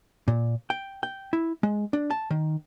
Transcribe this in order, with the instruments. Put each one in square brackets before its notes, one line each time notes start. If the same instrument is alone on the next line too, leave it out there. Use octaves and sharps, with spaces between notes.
[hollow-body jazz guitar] A#2
G5
G5
E4
G#3
D4
A5
D#3